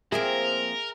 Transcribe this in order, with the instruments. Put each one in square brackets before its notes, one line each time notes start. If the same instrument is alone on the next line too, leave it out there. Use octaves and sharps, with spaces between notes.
[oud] F3 A#3 C4 [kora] G#4 E5 [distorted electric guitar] A#4